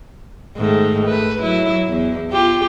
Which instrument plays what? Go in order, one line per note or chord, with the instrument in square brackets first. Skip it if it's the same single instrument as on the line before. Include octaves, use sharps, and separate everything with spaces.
[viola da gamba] G#2 D#3 A3
A3 B4
F#3 E4
E2
F4 G4